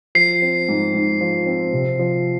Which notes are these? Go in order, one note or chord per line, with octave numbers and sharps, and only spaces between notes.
F3 C7
C4
G#2
G#2
F3
C4
C3
F3